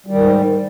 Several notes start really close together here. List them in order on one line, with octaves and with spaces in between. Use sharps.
G3 D#3 G#2